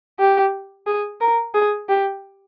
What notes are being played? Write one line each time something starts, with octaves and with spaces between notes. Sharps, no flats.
G4
G#4
A#4
G#4
G4